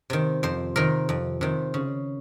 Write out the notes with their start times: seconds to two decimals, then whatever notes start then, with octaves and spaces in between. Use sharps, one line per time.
0.10 C3 D#3
0.43 F2 C5
0.76 C3 D#3 A#4
1.09 F2
1.41 C3 D#3
1.74 C#3